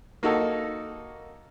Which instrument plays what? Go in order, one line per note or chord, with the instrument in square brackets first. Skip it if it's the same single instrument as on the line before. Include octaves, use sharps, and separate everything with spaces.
[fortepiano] A#3 D#4 F#4 A4